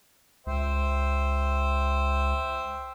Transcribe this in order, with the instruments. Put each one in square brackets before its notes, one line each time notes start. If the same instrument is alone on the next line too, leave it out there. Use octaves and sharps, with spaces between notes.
[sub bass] C#2 [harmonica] C5 E5 G5